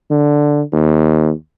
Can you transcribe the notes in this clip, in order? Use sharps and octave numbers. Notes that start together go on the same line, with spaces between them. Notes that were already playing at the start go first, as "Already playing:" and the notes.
D3
D#2